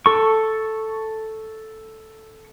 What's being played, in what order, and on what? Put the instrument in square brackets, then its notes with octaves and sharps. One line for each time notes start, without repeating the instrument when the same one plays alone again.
[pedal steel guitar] A4 C#6